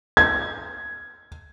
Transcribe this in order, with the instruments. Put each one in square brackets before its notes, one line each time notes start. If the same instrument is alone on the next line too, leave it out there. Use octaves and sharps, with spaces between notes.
[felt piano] G#6